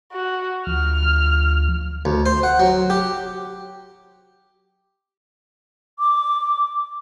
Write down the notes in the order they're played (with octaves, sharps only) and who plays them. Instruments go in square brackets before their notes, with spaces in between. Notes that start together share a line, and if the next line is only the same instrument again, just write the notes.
[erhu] F#4
[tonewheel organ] D2 F3 [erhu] F6
[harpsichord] D2
C5
F#5
F#3
G4
[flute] D6